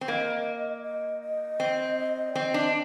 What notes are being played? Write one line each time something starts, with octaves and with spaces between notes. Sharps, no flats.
C4
A#3 D#5
D#5
D#5
C4
D5
C4 D#5
D4